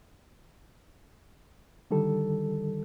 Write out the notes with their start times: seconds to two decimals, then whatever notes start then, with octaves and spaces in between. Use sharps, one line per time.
1.91 D3 D#3 G3 A4